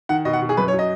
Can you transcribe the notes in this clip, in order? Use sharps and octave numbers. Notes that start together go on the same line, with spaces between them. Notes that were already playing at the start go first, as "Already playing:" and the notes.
D#3 F#5
B2 D#5
F#5
B2
G#4
F#2 B4
C#5
F#3
D#5